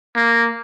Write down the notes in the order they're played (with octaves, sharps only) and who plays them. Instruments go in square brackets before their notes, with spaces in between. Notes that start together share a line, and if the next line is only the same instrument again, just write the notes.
[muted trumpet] A#3